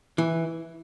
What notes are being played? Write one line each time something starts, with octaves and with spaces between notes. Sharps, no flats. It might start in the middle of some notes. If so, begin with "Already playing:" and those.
E3